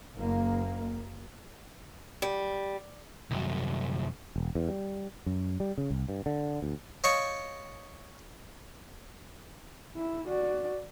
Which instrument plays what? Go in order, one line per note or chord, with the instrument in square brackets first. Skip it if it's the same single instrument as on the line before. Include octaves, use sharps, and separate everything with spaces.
[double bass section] F#1 A#3
[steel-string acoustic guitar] G3
[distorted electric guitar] C2 F#2
[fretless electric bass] E1
E2
G3
F#2
G3
C#3
C2
G2
D3
D2
[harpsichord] C#5 D#5 F5 G5 A5 C#6
[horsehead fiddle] E4
F#4 D5